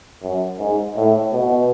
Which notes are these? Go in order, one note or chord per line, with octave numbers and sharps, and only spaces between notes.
F#2
G#2
A2
B2